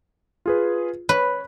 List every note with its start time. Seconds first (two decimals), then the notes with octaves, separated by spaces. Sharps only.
0.46 F4 G#4 B4
1.09 B4 C#5 B5